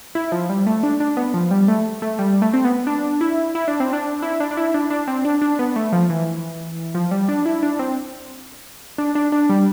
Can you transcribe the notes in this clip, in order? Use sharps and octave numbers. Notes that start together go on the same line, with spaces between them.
E4
F3
G3
A3
D4
D4
B3
F3
G3
A3
A3
G3
A3
C4
B3
D4
E4
E4
D4
C4
D4
E4
D4
D4
E4
D4
D4
C4
D4
D4
B3
A3
F3
E3
F3
G3
D4
E4
D4
C4
D4
D4
D4
G3